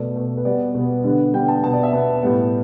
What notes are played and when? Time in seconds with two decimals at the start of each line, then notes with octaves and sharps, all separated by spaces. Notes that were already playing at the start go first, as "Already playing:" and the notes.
Already playing: B2 A3 D5
0.16 B2 A3
0.37 B4
0.45 B2 G3 B3 D5
0.75 B2 G3 B3
1.04 D3 G3 B3
1.34 D3 G3 B3 G5
1.48 A5
1.63 B2 B3 A5
1.73 D5
1.83 E5
1.93 B2 B3 A5
2.22 A2 G3 B3